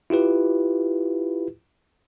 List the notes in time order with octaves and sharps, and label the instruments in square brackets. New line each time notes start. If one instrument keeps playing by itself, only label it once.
[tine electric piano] E4 F4 G4 B4